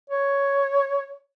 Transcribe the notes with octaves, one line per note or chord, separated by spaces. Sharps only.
C#5